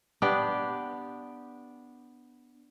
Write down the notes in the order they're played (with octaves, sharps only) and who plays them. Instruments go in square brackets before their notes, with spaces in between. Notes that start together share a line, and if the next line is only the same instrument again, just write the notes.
[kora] B3 D4 G4